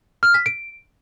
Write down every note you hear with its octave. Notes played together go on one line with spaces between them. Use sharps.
F6
B6
D7